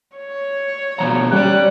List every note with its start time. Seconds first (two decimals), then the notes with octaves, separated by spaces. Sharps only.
0.17 C#5
0.99 B2 F3 A#5
1.32 G3 C#4 G4 D5 F#6